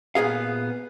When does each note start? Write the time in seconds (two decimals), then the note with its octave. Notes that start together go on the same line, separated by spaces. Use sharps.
0.15 A#2 B3 G#4 F5